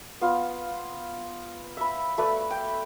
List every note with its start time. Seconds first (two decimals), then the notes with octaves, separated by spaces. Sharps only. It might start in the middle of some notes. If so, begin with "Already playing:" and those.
0.21 B3 F4 F#5
1.77 E5 B5
2.18 A3 B4 D5
2.51 G5